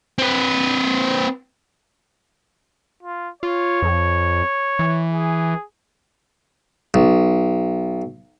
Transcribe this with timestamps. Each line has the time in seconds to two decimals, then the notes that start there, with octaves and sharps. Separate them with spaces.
0.18 C4 B4
3.03 F4
3.43 F4 C#5
3.82 F2
4.79 E3
5.12 G#4
6.94 B1